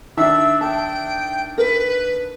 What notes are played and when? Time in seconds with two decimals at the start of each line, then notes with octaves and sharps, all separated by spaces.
0.17 D#3 D4 E5 E6
0.61 G5 A5
1.58 A#4 B4